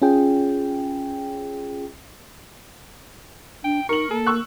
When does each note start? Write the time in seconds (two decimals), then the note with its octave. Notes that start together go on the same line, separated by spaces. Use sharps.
0.02 C#4 F4 G#4 G5
3.64 D4 G5
3.89 D#4 A#4 C#6 F#7
4.11 A#3 A4
4.26 C#6 E6 F#6